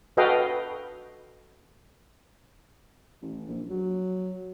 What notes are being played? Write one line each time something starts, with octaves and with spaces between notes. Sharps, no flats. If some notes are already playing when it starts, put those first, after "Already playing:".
F#4 A4 B4 D#5 F5 G5
A1
A#1
F#3